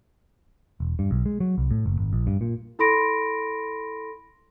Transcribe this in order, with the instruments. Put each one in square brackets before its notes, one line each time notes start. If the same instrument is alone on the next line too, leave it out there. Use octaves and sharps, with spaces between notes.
[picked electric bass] E1
G2
B1
G#3
F#3
C2
A2
F#1
G#1
A#1
G2
A#2
[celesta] E4 A4 B5 C6 A#6 D7